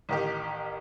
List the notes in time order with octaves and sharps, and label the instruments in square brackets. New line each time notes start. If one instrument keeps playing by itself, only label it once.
[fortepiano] A1 D#3 G4